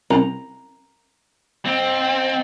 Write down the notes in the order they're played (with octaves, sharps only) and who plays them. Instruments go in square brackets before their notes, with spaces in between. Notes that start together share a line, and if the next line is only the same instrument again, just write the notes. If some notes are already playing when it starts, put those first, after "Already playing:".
[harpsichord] C2 [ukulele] A#5
[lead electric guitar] C4 [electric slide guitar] C5 D#5